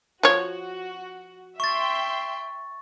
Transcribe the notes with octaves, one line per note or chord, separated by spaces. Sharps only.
F3 F#4 C#5
E5 G5 C6 C#6 A6